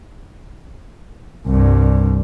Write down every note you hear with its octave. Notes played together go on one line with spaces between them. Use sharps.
C2 G2